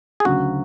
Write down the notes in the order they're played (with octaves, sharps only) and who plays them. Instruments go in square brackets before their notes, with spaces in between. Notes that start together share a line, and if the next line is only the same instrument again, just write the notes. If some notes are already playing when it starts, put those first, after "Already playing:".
[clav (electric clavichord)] G#4
[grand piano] D2 C#3 F#3 [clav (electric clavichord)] F#4